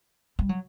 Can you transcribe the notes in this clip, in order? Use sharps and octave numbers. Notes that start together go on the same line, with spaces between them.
G3
F#3